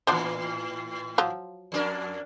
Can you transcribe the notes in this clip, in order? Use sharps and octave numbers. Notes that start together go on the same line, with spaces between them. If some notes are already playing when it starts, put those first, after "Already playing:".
A2 E3 B3 D4 C5
F3 F#3 F4
F2 D4 A#4